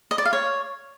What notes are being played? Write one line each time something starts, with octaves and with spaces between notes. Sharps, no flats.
D#5
D5
F5
C#5